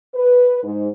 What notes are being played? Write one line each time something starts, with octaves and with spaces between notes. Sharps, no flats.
B4
G#2